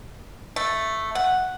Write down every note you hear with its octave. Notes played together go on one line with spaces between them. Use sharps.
A3
F#5